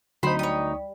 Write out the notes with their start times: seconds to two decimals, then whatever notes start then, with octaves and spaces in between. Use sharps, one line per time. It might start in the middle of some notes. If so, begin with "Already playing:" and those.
0.23 D2 D3 F#3 C4 D#4 C5 B5
0.39 G3 C#5 D#6